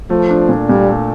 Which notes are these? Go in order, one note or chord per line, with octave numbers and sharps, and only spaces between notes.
F3 A3
D4
A#2
A#2 G3
A3